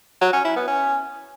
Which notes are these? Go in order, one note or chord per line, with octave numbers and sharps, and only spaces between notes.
F#3
C#4
E4
B3
C#4